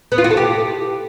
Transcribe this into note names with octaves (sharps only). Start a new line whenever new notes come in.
B3
F4
F#4
A4
G4